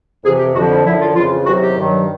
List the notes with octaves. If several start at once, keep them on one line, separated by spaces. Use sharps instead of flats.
F2 C3 E3 G#4
G4
F2 D3 F3 F#4
E4
F#2 D3 F3 E4
F4
F2 C#3 E3 F4
E2 C3 D#3 F#3 F#4
G4
G2 D#3 F#3